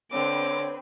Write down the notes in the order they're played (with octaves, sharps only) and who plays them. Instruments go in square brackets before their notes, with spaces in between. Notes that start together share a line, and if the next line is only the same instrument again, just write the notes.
[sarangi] D3 [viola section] C4 B4 [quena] C#5 [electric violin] D6